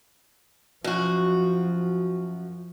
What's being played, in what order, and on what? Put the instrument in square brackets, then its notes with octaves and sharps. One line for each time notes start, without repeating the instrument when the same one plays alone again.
[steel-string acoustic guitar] F#2 F#4 [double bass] F3